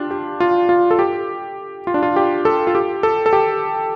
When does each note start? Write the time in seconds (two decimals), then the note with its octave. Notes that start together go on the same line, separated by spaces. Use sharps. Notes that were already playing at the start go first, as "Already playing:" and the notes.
Already playing: D4 F4 G4
0.11 G4
0.40 F4
0.69 F4
0.91 A4
0.99 G4
1.87 F4
1.94 D4
2.03 F4
2.16 G4
2.45 A4
2.67 F4
2.75 G4
3.03 A4
3.26 A4
3.33 G4